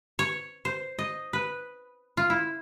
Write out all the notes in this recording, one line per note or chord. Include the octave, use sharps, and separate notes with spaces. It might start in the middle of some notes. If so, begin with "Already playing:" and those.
C#5
C5
D#5
B4
F4
E4